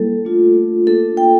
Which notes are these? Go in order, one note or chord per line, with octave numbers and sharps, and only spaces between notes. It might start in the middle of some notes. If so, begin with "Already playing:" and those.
Already playing: G3 A#3 E4 A4
A3 D4 F4
A#3 D4 F4 A4
G5